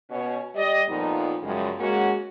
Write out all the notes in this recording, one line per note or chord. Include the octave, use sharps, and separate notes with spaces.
B2 C#4 C#5
G3 G4 D5 D#5
F2 A#2 F3 B3 D#4
F#2 C#3 F3 G3 G#3
G#3 A#3 C#4 F#4